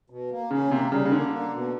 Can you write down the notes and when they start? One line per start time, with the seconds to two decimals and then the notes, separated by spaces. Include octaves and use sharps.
0.10 B2
0.31 A#3
0.51 C#3 C#4
0.71 C3 A#3
0.91 C#3 G3
1.06 C#3
1.12 D3 A#3
1.32 A#3
1.53 B2